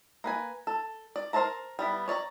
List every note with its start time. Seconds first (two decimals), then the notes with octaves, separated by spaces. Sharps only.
0.24 A#3 B4 G#5
0.67 A4
1.16 D5
1.33 A#4 C5 E5 A5 A#5
1.79 G3 B3 E4
2.08 C#5 D5 E5 A#5